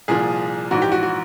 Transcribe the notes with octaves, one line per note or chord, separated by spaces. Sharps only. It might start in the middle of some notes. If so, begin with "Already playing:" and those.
C2 A#2 F3 G#4
A#1 G#2 E3 F#4
G4
F#4
F#4